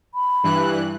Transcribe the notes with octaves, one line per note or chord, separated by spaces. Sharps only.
B5
G2 E3 F#6